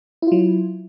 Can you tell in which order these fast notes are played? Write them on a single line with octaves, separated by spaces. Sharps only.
E4 F4 F#3